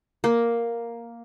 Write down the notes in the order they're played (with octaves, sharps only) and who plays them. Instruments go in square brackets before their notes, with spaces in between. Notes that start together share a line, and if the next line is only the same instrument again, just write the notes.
[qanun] A#3